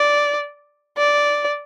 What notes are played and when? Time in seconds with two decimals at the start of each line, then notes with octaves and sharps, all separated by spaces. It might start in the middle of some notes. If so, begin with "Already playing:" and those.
Already playing: D5
0.98 D5